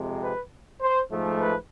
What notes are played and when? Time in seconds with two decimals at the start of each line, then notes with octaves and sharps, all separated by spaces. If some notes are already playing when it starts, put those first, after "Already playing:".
Already playing: F2 C3 G#3
0.21 B4
0.81 C5
1.10 G#2 F3 A3
1.40 B4